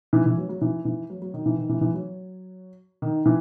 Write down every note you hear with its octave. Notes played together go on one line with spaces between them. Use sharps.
E3
E3
F#3
F#3
E3
E3
F#3
F#3
D#3
E3
D#3
E3
E3
F#3
D#3
E3